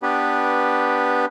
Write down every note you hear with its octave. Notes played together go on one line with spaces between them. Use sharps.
B3 D4 G4 B4